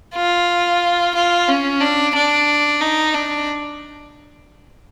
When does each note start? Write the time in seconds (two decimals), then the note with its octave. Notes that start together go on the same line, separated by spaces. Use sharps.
0.16 F4
1.15 F4
1.48 C#4
1.81 D4
2.15 D4
2.81 D#4
3.14 D4